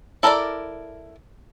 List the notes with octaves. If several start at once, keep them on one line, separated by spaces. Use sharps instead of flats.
E4 A4 A#4 C#5 D5